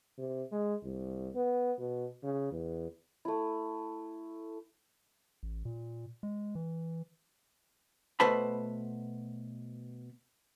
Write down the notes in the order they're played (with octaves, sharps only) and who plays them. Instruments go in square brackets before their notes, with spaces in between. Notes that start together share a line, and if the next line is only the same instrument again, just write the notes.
[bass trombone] C3
G#3
C2
B3
B2
C#3
E2
[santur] A3 E4
[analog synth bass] A1
A#2
G#3
E3
[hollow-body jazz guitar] B2 A3 B4 C5 A5 B5